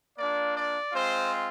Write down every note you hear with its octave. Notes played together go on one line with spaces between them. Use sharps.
A#3 D4 F4 D5
D5
G#3 C4 F4 C5